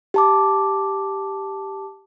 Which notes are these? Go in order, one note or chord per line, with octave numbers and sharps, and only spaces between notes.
G4 A5 D6